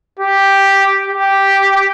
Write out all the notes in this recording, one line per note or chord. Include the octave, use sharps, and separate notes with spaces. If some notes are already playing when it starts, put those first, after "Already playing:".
G4
G4